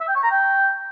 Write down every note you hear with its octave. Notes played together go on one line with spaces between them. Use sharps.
E5
G5
C#6
A#5
G5